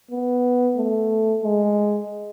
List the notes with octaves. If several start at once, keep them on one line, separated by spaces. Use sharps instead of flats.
B3
A3
G#3